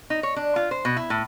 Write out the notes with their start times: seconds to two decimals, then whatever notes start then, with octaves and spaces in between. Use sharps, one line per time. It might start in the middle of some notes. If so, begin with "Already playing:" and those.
0.10 D#4
0.23 C#5
0.36 D4
0.56 F4
0.71 C5
0.85 B2
0.97 E4
1.10 A2